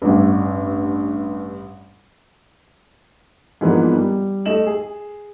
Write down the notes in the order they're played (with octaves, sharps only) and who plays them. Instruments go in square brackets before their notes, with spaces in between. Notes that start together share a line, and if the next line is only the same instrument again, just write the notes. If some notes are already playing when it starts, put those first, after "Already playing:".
[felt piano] A1 G2
[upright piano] G#2 E3 F3 A#3 B3 D4
G3
A3 D#5 E7 F#7
G#4